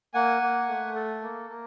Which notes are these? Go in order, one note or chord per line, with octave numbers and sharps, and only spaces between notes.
A#3 F#5 G#5
A#3
A3
A4
A#3
A#3